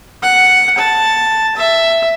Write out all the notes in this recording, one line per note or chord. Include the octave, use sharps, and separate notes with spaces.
F#5
A5
E5